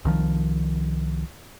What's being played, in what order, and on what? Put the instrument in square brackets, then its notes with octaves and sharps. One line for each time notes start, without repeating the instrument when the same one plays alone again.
[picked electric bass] C2 D#3 F3